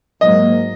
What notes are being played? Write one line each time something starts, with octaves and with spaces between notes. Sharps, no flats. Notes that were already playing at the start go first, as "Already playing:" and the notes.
G#2 F#3 A#3 D#5